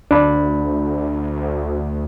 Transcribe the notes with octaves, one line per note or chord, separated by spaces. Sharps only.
D2 D4 B5